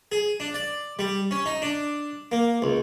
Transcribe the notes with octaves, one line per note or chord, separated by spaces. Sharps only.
G#4
D4
D5
G3
C#4
D#4
D4
A#3
C#2